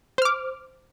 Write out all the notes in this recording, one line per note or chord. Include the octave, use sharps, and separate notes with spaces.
C5 D6 F6